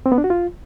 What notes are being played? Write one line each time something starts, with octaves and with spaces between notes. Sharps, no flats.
C4
B3
D4
F#4
F4